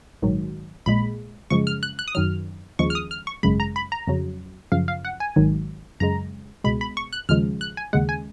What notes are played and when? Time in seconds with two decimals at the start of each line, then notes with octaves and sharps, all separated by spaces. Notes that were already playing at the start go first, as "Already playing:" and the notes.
0.22 A#1 G#2 D#3 F#3
0.86 A#1 A#2 G#3 B5
1.50 F#2 C#3 F3 G#3 C#6
1.67 F6
1.83 F#6
1.99 F#6
2.08 D#6
2.15 F#2 D#3 F#3 F6
2.79 D#2 C#3 F3 G#3 C#6
2.90 F6
2.95 D#6
3.11 F6
3.27 C#6
3.43 G#1 F#2 C#3 G#3 B5
3.60 A#5
3.76 B5
3.92 A#5
4.07 F2 C#3 F#3
4.72 F#2 C#3 F3 F5
4.88 F5
5.05 F#5
5.20 G#5
5.36 G#1 G#2 D#3 F#3
6.00 F#2 C#3 G#3 A#5
6.64 C#2 B2 G#3 B5
6.81 B5
6.97 C#6
7.13 F#6
7.29 D#2 C#3 F3 G#3 F6
7.61 F#6
7.77 G#5
7.93 D#2 C#3 G#3 F#5
8.09 G#5